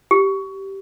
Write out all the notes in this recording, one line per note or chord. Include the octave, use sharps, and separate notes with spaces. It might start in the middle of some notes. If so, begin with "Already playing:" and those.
G4